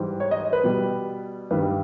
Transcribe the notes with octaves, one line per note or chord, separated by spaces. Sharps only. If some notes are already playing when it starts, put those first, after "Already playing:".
Already playing: G#2 E3 G3
C#5
D#5
B4
B2 G3
G2 D#3 G3 B4